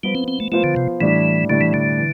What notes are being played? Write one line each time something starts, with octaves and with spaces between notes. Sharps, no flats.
F3 G3 B3 F4 C5
C4
C4
A3
F3 A3 B3 F4 C5
D3
C3
A2 E3 G3 D4
A2 D3 G3 D4
E3
D3
E3